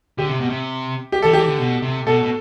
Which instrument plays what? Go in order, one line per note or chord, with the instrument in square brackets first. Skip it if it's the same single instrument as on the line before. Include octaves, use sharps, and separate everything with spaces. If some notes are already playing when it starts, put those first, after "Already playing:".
[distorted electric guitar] D3 [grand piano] G4
[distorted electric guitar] C3
B2
C3
[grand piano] G4
[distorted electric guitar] E3 [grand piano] A4
[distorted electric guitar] E3 [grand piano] G4
[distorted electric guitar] D3
B2
C3
[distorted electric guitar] B2 [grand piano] A4
[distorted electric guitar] B2